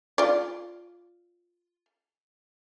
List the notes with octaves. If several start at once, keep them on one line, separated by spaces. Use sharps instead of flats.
F4 D5